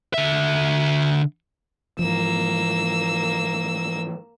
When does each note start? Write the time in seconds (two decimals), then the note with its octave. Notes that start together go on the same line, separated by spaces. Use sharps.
0.14 D3 E5
1.99 G#2 E3 F3 A#3 E6